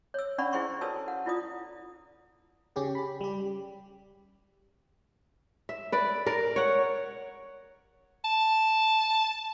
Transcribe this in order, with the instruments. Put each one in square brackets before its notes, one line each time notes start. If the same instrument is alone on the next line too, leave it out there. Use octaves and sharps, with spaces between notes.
[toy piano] C#5 E6
C#4 D4 D5 F#5 B5 C#6
E4 G#4 C5 G5 C6 C#6
F#4 A4 B4 C#5 A5 E6
F#5
E4 F4 D5 D#6
[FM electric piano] C#3 C#4 G4 G#4
B5
G3 G4
[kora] E5
B4 D5
A#4 D5
C#5 F#5
[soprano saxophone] A5